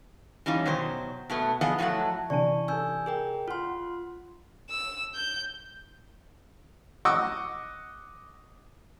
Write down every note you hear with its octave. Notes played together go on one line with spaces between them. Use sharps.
E3 G3 C#4 D#4 F4
B2 D#3 F#3 C5
B2 A3 B3
F3 B3 G#4 D#5 F#5
A2 F3 F#3 A3 F#5
C3 E3 D4 D5 G#5 A5 C#6
D#4 A4 G#5 E6 G6
G#4 A#4 G5
F4 F#5 C6 F6
E6
G6
D#5 F#5 C#6 D6 E6